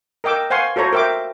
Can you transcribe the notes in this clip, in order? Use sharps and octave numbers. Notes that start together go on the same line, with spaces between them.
A#4 D#5 G5 D6 E6
C5 F5 F#5 G#5 C6 C#6
F#4 A4 C5 C#5 A#5
A#4 C5 E5 G5 D6